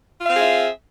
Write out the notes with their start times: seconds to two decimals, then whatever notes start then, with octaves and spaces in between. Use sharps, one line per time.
0.20 F4
0.25 F5
0.29 C4
0.34 G#4
0.39 E5